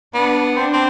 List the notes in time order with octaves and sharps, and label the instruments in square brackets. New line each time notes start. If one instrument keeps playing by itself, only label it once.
[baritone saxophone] B3 [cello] D4
[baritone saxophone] C4 [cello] D4
[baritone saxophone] C4